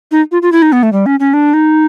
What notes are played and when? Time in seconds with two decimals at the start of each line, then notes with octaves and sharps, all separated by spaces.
0.12 D#4
0.32 F4
0.42 F4
0.52 E4
0.62 D#4
0.72 B3
0.83 A3
0.93 G3
1.06 C#4
1.20 C#4
1.34 D4
1.54 D#4